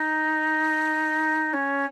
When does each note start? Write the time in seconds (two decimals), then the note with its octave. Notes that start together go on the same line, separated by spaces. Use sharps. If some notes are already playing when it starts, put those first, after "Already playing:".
Already playing: D#4
1.53 C#4